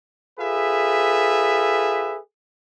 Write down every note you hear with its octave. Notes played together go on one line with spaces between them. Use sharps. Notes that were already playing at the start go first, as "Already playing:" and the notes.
F4 G#4 A4 B4 E5